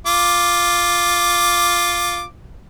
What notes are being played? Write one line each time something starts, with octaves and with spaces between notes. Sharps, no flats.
F4 D6